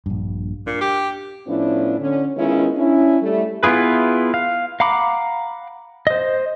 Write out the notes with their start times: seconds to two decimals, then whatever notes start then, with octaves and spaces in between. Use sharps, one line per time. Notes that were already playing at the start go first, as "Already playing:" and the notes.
0.06 A#1 G2
0.67 A#2 D4
0.81 G4
1.47 A2 F3 B3 C#4 D4 E4
1.99 D3 C#4
2.37 D#3 G#3 B3 C#4 E4 F4
2.76 C#4 D4 E4
3.21 G3 A3
3.63 B3 E4 F4 G#4 B4
4.34 F5
4.80 F5 F#5 A#5 B5 D6
6.07 C5 D#5